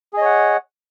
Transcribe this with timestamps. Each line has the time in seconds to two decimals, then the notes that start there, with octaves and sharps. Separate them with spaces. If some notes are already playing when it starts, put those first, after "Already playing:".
0.14 G#4
0.18 D#5
0.21 C#5
0.25 F#5